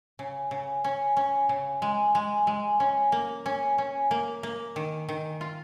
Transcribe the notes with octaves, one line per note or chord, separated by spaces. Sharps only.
C#3
C#3
C#4
C#4
C#3
G#3
G#3
G#3
C#4
A#3
C#4
C#4
A#3
A#3
D#3
D#3
F4